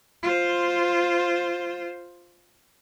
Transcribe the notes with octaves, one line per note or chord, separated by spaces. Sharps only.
F4 C5